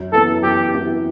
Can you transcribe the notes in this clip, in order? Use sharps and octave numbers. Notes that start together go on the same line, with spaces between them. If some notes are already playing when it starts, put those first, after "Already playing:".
Already playing: F#2
E3 B3 A4
F#2 G4
E3 B3